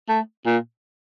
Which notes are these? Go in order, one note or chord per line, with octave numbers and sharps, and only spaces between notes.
A3
A#2